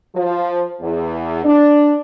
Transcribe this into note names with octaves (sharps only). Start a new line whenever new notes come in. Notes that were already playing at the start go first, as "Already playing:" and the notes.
F3
E2
D4